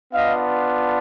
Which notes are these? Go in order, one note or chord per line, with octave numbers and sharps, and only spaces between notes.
B3 D4 F4 D#5 F5